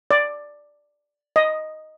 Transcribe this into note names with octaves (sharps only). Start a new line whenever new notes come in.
D5
D#5